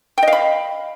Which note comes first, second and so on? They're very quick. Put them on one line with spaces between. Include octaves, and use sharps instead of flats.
G5 D#5 F5 B5